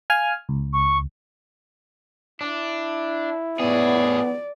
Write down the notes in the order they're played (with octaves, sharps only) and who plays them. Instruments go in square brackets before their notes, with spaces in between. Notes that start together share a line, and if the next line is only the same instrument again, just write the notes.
[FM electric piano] F5 G#5 F6
C#2
[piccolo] C#6
[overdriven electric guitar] D4 [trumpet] E4
[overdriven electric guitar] A2 G#4 [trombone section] B3 [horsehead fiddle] D5